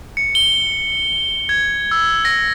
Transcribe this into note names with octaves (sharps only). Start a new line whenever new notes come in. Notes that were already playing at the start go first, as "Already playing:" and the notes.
C#7
G7
G#6
E6
A#6